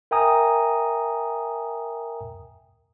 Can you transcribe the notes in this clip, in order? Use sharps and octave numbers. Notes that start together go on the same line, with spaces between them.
A#4 E5 G5 G#5 A#5 D#6